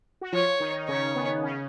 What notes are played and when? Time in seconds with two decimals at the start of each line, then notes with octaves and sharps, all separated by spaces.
0.21 F#4
0.32 F3 F4 C#5
0.60 D#3 D#4
0.76 D#4
0.88 C#3 C#4 C#5
1.15 B3
1.43 C#3 C#4